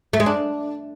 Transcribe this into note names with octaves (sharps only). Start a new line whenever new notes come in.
A3
G#3
D4